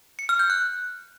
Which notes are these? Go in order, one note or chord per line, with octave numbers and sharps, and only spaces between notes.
C#7
F6
G6
F#6